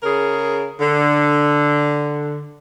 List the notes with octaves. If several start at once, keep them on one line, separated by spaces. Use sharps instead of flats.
C#3 G#4 A#4
D3